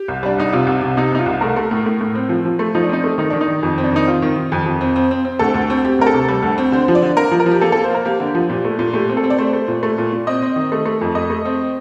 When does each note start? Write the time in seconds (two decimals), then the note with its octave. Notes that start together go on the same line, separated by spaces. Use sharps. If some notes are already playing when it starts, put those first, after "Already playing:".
Already playing: G4
0.08 C2
0.23 G3 D4
0.38 C2 D#4
0.52 C3 F4
0.67 C2
0.82 C3
0.97 C3 D#4
1.12 C2 D#4
1.19 F4
1.26 C2
1.41 A3 A#4
1.56 A3
1.71 A2
1.86 A2
2.01 A2
2.15 C4
2.29 F3
2.45 F3
2.59 A3
2.75 F3 D#4
2.84 D4
2.89 C4 D#4
3.04 A3
3.18 D#3 D#4
3.30 D#3 D4
3.41 D#4
3.48 D#3
3.63 F2
3.78 C4
3.84 D4
3.93 D#3 D#4
4.07 C4 F4
4.22 D#3
4.36 D#3
4.52 F2
4.66 F2
4.81 C4
4.96 C4
5.11 C4
5.25 C4
5.39 D2 A4
5.54 D2
5.70 C4
5.85 C4 G4
5.99 D2 A#4
6.07 A4
6.14 C3
6.28 G3
6.43 D2
6.58 C4
6.72 D3 C5
6.88 F3
6.95 D5
7.02 D3
7.17 A#3 A#4
7.31 F3
7.40 A#4
7.46 F3
7.51 G4
7.61 A#3 A4
7.72 A4
7.76 A#3
7.84 C5
7.90 A#3 A#4
8.05 A#3 G4
8.20 D3
8.35 F3
8.49 A#2 G4
8.65 A3
8.79 A#2
8.94 A3 G4
9.10 C4
9.17 A4
9.24 C4
9.30 D5
9.38 A3 C5
9.53 A3
9.68 A#2
9.83 A3
9.98 A#2
10.13 A#2
10.27 C4 D#5
10.42 C4
10.56 D#3
10.72 A3
10.86 A3
11.01 F2
11.15 A3 D#5
11.30 A3
11.45 C4